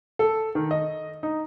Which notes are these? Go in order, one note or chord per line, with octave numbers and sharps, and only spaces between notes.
A4
D#3
D#5
D#4